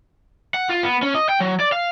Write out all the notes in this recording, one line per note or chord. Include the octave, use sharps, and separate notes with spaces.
F#5
F4
B3
C#4
D#5
G5
F#3
D5
F5